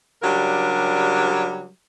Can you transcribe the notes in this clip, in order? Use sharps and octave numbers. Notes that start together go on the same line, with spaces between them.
C#3 F#3 G3 D4 G4 A#4